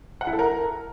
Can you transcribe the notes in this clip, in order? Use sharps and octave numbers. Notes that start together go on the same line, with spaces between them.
F#5
E4
A4
A#4